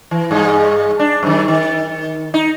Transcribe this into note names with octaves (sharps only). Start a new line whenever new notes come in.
E3
G2 G#3
D4
F#2 D#3
D#3
D#4